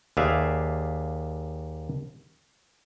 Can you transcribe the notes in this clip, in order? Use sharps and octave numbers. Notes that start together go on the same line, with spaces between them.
D#2 G#4 B4 D5 E5 F5